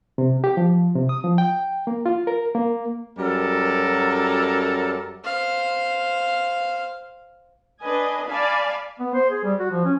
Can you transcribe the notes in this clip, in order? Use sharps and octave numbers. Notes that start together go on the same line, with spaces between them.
C3
G4
F3
C3
D#6
F3
G5
A#3
F4
A#4
A#3
F#2 F#3 G3 A4 A#4
C5 F5
D4 B4 D#5 G#5
D5 F5 G#5 A5 B5
B3
C5
G#4
G3
F#4
F3
C#4